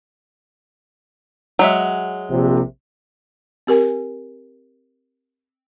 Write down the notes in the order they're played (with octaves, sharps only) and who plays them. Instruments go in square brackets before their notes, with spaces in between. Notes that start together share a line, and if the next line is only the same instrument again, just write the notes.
[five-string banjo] F#3 G#3 E5
[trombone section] A#1 C3
[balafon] C4 G4 A#4 G#5